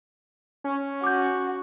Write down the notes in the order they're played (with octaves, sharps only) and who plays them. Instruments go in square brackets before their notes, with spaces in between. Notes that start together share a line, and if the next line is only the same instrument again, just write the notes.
[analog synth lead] C#4
[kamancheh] F#4 [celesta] D6 G6